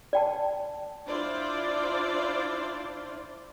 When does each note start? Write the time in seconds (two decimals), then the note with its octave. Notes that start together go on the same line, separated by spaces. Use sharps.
0.13 D5 G5 A5
1.07 D4 E4 F4 C5 D5